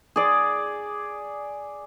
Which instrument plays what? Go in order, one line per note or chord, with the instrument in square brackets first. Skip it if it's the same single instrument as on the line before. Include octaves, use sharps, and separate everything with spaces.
[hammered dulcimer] G#4 D5